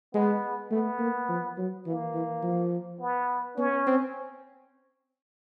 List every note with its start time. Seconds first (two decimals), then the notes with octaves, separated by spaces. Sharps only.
0.14 G#3 B3
0.71 A3 B3
0.99 A#3
1.29 F3
1.57 F#3
1.86 E3 A#3
2.14 E3
2.43 F3
3.01 B3
3.57 B3 C#4
3.87 C4